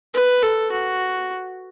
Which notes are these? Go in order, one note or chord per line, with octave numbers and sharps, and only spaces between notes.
B4
A4
F#4